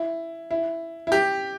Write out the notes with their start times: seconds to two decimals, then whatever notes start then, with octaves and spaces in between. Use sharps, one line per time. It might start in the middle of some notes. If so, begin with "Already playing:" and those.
Already playing: E4
0.51 E4
1.07 E4
1.12 G4